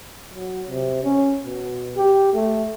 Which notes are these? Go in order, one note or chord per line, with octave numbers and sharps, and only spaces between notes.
F#3
C3
C#4
B2
G4
A3